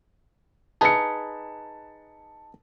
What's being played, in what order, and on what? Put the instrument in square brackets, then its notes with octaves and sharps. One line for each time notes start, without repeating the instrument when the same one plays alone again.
[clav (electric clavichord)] D#4 G#4 B4 [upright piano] A5 C#7